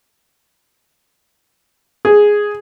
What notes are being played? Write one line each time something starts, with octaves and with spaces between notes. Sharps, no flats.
G#4